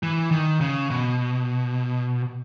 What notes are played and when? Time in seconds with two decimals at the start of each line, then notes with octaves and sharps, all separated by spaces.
0.03 E3
0.31 D#3
0.61 C#3
0.90 B2